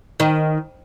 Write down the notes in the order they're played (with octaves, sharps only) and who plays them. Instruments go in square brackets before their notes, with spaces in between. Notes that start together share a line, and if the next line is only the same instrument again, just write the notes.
[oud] D#3